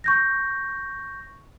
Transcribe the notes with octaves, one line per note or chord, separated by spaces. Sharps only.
C#6 G6 A#6